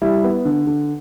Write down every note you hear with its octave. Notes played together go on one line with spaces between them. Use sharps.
G3 E4
B3
D3
D3